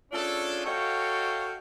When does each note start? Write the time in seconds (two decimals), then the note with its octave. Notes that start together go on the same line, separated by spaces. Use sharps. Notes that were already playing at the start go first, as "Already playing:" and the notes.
0.12 A3 C#4 D4 F4 G#4 A4
0.66 F#4 A4 C#5 D#5 F5 G5